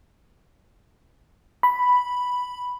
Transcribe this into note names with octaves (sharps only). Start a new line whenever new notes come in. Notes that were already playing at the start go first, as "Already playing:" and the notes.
B5